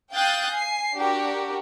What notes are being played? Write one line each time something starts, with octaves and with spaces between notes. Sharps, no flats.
F5 G5 D#6 F#6 G6 A6
G#5 C7
D4 F#4 G4 A#4